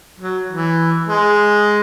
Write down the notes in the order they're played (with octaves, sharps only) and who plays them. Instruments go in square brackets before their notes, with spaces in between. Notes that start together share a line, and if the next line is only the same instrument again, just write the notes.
[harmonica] F#3
E3
G#3